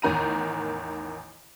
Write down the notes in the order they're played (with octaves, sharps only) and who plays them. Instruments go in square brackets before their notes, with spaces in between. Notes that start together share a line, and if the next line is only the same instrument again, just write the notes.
[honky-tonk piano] A1 E2 D#3 A#5 D#7